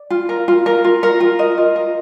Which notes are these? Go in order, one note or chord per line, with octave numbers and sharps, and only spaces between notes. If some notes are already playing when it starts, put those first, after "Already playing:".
Already playing: D5
F4
A#4
F4
A#4
F4
A#4
F4
A#4 D#5
F4
A#4